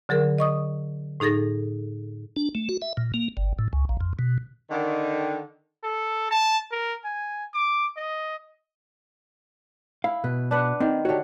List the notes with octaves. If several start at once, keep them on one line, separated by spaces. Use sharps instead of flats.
D3 F#3 G#4 A#4
D#5 C#6 D#6
A2 D#4 G#4 A4 A#6
D4
A3
F#4
E5
A#2
A#3
G1
A2
C#2
A#1
F2
B2
D3 D#3
A4
A5
A#4
G#5
D6
D#5
E4 F5
B2 B4
D4 B4 F#5
D#3 C4
D3 F#4 G4 C#5